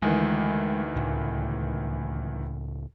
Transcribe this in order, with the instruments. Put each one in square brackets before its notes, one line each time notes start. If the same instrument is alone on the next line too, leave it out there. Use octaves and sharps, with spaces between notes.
[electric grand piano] D2 D#3 E3 [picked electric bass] G#3
[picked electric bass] C#2 A2